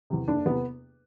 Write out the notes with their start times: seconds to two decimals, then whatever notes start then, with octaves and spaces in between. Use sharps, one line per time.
0.10 E2 C3
0.28 F#1 D4
0.45 E2 C3 B3